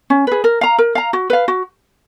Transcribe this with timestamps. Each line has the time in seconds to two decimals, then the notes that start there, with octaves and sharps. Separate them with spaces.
0.10 C#4
0.27 G#4 B4
0.44 A#4
0.61 F5 A#5
0.78 A#4
0.95 F5 A#5
1.13 F#4
1.30 B4 F5
1.48 F#4